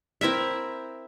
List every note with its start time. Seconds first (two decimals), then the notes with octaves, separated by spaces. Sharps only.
0.21 C4 E4 A#4 E5